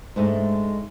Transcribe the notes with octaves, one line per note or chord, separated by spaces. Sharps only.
G#2 G#3 A3 D4